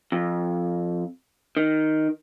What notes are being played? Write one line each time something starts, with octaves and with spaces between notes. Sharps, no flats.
F2
D#3